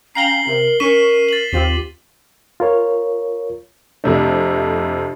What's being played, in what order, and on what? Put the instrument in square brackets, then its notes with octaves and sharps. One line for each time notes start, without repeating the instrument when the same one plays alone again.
[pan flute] C#4 [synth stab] F5 G5 A#5 [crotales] C7 F#7 G7
[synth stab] C3 [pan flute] A#4
[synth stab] C#4 C#6 [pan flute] A#4 [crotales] B6 D#7 E7
[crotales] A6 F#7
[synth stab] D#2 C4 F4 [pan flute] G4
[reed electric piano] F4 A#4 C#5
[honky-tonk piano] F2 C3 A3 [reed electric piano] D4